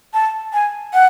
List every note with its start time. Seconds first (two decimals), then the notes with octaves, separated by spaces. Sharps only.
0.14 A5
0.53 G#5
0.94 F#5